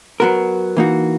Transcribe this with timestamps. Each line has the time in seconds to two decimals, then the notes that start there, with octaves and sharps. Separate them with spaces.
0.20 F#3 B3 F#4 A#4
0.77 E3 A#3 D#4 F#4